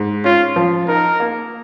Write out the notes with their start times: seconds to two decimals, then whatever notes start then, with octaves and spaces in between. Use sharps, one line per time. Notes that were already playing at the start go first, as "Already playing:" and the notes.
Already playing: G#2
0.24 C#4 F4
0.56 F3
0.88 D#4 A#4
1.20 A#3